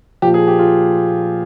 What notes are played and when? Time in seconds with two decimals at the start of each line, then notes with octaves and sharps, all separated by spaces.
0.22 A#2 F3 G4
0.34 G#4
0.47 G4
0.59 F4